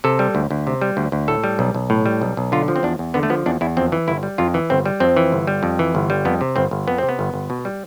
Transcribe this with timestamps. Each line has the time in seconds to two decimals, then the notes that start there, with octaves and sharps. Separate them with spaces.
0.04 C3 A4
0.19 G3
0.35 D2
0.51 D2
0.67 C3
0.82 G3
0.97 D2
1.12 D2
1.28 A2 A4
1.44 G3
1.59 B1
1.74 B1
1.90 A2
2.06 G3
2.21 B1
2.37 B1
2.52 D3 F4
2.68 F3
2.76 C4
2.83 E2 D4
2.99 E2
3.14 D3 B3
3.23 A3
3.30 F3 B3
3.46 E2 D4
3.61 E2 E4
3.77 F2 C4
3.92 E3
4.08 G1 E4
4.23 G3
4.38 F2 F4
4.54 E3
4.70 G1 C4
4.86 G3
5.00 F2 C4
5.17 E3
5.32 G1
5.47 G3
5.63 F2
5.79 E3
5.95 G1
6.10 G3
6.25 F2 B3
6.41 C3
6.56 G1 C4
6.71 G1
6.88 F2 B3
6.98 C3 C4
7.09 B3
7.19 G1
7.34 G1
7.50 B2
7.65 G3